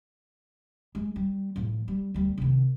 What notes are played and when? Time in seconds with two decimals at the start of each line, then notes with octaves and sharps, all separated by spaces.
0.95 G#3
1.16 G3
1.56 A2 F3
1.88 G3
2.14 D2 G3
2.38 C3 D#3